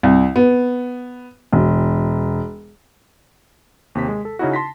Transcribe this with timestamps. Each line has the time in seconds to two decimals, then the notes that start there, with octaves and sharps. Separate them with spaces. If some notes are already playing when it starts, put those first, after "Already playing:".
0.03 C2
0.36 B3
1.53 E1
3.95 D#2 C3 B6
4.08 G#3
4.25 A4
4.39 C#3 C#4 D#4 E4 F#4
4.53 A5 C6 A#6 B6